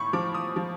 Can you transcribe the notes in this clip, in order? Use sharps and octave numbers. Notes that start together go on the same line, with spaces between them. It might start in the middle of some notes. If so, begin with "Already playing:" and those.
Already playing: A2 B5 C#6
F3 D6
D#6
F3